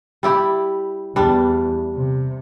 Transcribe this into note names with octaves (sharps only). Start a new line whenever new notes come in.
G3 E4 G4
E2 G3 D4
C3